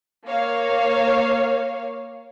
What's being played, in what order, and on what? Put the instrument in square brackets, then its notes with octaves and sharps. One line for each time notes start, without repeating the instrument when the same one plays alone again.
[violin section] A#3 C#5 F5